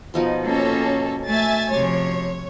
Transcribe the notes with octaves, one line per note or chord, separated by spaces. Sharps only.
B2 F3 D#4
A#3 C#4 A4
A3 E5 G#5 A6
C3 F3 C#5